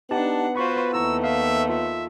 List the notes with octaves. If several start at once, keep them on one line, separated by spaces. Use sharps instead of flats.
B3 D4 D#4 G4 F#5 A5
F4 F#4 B4 C5 B5 C#6
D#2 A3 E4 A#5 C#6 E6
E5 F5 E6
F4 E5